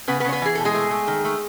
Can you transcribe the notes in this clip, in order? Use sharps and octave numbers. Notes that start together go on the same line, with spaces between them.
C#3 B3 B4
B3 B4
C#3 C#5
B3 B4
E3 G#4
B2 A4
G#3 G#4
A3
A3
D#3
A3